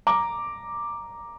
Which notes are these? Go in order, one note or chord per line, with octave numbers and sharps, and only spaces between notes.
A#5 D6